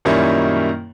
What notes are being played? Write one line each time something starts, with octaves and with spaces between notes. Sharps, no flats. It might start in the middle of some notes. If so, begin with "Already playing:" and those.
F#2 A#2 D#3 G3 C#4 E4